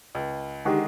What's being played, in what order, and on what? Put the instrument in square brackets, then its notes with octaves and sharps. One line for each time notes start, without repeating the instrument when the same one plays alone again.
[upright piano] C#2
[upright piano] D3 D#3 G#3 [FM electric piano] D#4 G4 F#5